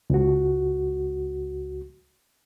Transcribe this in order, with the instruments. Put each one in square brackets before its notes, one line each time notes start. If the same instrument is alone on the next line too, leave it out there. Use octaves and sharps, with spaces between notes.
[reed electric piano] C#2 F#4